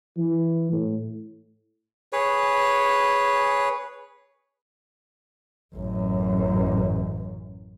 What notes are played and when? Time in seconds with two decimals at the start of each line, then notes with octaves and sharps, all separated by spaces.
0.18 E3
0.72 A2
2.13 G#4 B4 C#5
5.75 A1 F#2